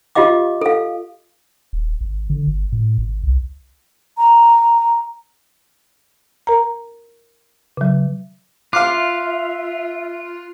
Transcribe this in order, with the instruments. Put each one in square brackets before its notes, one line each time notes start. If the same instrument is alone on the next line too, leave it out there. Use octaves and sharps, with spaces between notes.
[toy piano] F4 G4 D#5 F5 D6
A4 F5
[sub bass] D#1
G#1
D3
G1
A2
G#1
C2
[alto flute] A#5
[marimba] A#4 A#5
C#3 F#3
[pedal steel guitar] F4 [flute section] E5 [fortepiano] F5 D6 [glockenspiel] F#6 C7